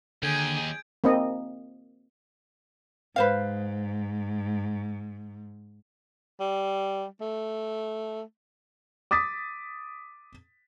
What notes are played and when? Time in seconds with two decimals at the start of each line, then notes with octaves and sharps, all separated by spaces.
0.23 D#2 D3 G#4 G6 G#6 D7
1.04 A#3 C4 D#5
3.16 G#2 B4 C5 F5
6.40 G3
7.21 A3
9.11 D6 D#6 A6 B6